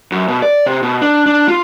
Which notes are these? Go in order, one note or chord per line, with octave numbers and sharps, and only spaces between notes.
F#2
B2
D5
C3
B2
D4
D4
F4